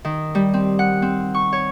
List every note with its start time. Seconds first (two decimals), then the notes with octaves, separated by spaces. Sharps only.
0.05 D#3
0.35 G3
0.54 C4
0.79 F#5
1.02 C4
1.35 C#6
1.52 C#5